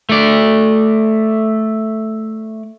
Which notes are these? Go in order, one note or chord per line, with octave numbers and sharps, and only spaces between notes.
A3 D5